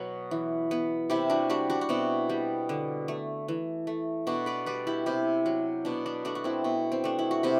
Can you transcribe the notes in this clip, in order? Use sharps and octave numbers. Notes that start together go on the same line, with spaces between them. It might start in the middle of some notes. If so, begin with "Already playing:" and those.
Already playing: B2 F#3
E3
B3
C3 E4 G4
D4 F#4
G3 D4 F#4
D4 F#4
F#4
B2 C4 E4
G3
D3
A3
E3
A3
B2 D4 F#4
B4 D5
G3 B4 D5
E4 G4
C3 E4 G4
F#3
B2 D4
D4
A3 D4 F#4
F#4
C4 E4
B2
C4
A3 D4
E4
F#4
C3 E4 G4